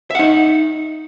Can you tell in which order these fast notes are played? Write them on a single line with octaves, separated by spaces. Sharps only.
E5 F#5 D#4